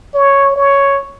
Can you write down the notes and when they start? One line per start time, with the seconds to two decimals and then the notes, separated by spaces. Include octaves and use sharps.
0.15 C#5
0.56 C#5